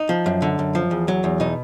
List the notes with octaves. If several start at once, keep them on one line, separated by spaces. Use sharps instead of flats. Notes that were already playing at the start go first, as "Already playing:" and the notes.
Already playing: D#4
F3
F#2
D3
F#2
F3
E2
F#3
E2
B2 D#4